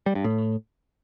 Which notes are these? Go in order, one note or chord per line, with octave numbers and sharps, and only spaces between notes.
G3
G2
A2